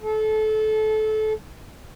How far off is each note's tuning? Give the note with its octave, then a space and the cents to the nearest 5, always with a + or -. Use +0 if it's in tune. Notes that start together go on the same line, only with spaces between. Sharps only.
A4 -25